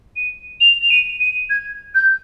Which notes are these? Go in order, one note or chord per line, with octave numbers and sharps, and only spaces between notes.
D#7
F7
F7
D#7
D#7
G#6
G6